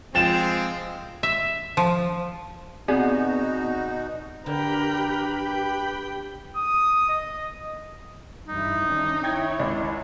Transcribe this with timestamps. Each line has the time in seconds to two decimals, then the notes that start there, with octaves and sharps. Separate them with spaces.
0.15 F3 G#3 C4 F4 G5 A6 E7
1.23 E5
1.77 F3
2.88 B2 B3 C4 D#4 F#4 G#4 D5
4.46 D3 G4 A#4 B4 G5 B5
5.32 G5
6.56 D#6
7.09 D#5
8.48 G2 E3 D#4 E4
8.87 D#3 C#4 D4
9.23 E4 C#5 G5 G#6
9.59 G#1 C#2 D5